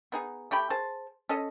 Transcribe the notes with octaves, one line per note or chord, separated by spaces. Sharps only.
B3 D#4 G#4
A3 G4 G5 B5
G#4 C5 A5
C#4 A4 D#5